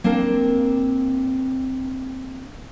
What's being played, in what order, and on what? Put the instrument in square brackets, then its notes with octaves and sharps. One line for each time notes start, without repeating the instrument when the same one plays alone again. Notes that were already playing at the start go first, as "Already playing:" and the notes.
[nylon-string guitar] A#3 C4 D4 A#4